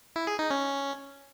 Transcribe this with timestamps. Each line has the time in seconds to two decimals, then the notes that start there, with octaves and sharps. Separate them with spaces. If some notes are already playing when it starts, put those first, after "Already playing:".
0.16 E4
0.27 G#4
0.39 D#4
0.50 C#4